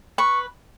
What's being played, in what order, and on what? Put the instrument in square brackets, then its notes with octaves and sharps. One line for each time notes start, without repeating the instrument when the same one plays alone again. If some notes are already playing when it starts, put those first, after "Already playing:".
[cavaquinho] B4 C#6